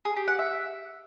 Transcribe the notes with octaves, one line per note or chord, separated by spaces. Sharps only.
G#4
G4
F#5
E5